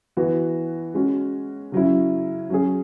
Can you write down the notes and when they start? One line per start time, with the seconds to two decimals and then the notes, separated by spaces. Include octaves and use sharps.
0.17 E3 B3 F#4
0.94 G#3 C#4 F#4
1.72 C#3 F#3 C#4 E4
2.50 F#3 C#4 G#4